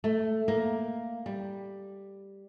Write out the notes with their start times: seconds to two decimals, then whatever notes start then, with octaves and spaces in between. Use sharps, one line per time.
0.04 A3
0.48 A#3
1.26 G3